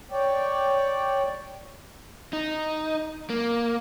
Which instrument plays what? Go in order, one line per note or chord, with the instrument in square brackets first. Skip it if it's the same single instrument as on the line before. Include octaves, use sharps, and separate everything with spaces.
[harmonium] C#5 D5 G5
[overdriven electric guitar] D#4
A#3